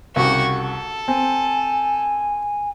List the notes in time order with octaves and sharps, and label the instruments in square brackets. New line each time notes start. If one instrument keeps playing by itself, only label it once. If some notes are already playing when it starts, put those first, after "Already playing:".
[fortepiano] C2 C#3 [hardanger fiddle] F#4 G4
[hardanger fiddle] A4
[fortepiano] C4 [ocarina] G#5